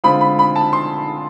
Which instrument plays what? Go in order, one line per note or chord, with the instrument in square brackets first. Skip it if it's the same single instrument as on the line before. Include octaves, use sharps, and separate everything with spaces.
[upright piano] D3 G#3 C4 F4 B5
B5
B5
A5
C6